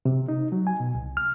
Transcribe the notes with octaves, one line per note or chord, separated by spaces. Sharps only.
C3
D#4
F#3
G#5
B2
C2
F6